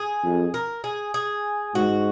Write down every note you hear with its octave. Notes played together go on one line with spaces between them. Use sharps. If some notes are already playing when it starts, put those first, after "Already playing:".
Already playing: G#4
F2
A#4
G#4
G#4
G#2 F#4